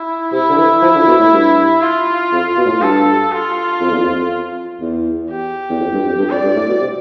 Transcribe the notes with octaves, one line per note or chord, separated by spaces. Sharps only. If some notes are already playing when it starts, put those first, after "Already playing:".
Already playing: E4
C3 E4
D3
E3
F3
D3
B2
A2
G2
F4
F2
B2
A2
G2 A4
F4
F2
E2
F2
E2
G4
E2
F2
G2
F2
G2
F2 D5
G2
A2
B2
C3